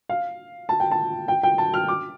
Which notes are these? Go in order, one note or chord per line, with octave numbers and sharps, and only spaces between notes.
F5
A5
G5
A5
G5
G5
A5
F6
D6